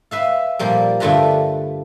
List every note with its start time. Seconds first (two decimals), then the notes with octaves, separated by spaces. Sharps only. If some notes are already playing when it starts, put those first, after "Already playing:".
0.11 B4 E5 F5
0.59 A#2 F3 G3 A#3
1.00 G2 D3 A3 F4 B4 A#5